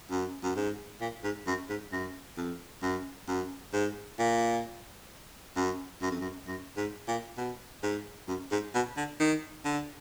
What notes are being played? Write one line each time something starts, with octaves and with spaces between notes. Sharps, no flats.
F#2
F#2
G#2
A#2
G#2
F#2
G#2
F#2
F2
F#2
F#2
G#2
A#2
F#2
F#2
F2
F#2
F#2
G#2
A#2
B2
G#2
F#2
G#2
B2
D3
D#3
D3